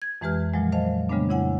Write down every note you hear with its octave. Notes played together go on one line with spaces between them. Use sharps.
G#6
F2 E3 G#3 G4 B4 F6
A#2 F3 F#3 G#3
C5 D#5 F5 A5
C#3 G3 G#3 A#3 B3 D4
F2 C#3 E4 F#5 G#5